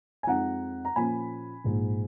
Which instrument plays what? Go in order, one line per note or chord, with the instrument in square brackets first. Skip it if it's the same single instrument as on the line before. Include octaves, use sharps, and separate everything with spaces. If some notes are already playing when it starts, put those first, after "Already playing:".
[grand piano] G#5
F2 F3 G#3 D#4 F#5 A#5
A#5
A#2 F3 A#3 C#4 G#5 B5
A#1 G#2 F3 G#3